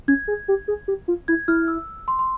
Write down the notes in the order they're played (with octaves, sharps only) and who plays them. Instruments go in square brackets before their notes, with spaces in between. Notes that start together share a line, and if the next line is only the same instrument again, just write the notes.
[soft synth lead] C#4 [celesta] G#6
[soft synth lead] G#4
G4
G#4
G4
F4
[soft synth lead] E4 [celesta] G#6
[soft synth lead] E4 [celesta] F6
[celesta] E6
C6
C6